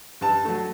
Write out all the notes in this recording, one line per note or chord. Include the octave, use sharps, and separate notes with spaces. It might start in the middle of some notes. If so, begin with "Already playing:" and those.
G2 A5
F#3 A3